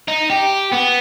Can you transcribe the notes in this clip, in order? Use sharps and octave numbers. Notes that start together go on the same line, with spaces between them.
D#4
G4
B3